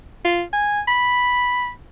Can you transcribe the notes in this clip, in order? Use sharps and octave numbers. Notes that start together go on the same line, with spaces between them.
F4
G#5
B5